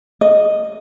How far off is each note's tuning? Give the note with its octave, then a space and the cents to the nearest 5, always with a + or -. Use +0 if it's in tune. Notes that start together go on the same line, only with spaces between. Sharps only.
D#5 -5